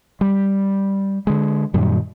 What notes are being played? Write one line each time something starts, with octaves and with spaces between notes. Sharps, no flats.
G3
D3 G#3
F#2 A#2 D#3 G3